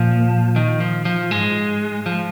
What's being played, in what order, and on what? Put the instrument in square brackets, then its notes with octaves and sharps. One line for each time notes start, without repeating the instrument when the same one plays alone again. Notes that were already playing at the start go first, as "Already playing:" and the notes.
Already playing: [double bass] A#2 [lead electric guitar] F3
[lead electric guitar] D#3
F3
F3
[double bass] G#2 [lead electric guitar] G#3
[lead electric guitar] F3